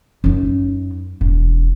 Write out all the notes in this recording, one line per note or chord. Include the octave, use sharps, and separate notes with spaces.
F#2 D#4
E1